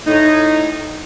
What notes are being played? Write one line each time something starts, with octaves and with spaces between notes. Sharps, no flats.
A2 D#4